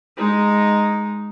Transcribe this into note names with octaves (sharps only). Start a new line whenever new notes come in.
G#3 D#4